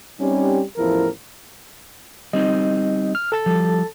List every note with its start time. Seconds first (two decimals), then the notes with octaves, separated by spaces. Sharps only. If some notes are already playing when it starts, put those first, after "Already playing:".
0.19 G3 C4 C#4 D#4 G4
0.77 A1 E2 F3 E4 A#4
2.33 G3 C4 D#4 D#5
3.15 F6
3.32 A4 A5 A6
3.46 F3 G3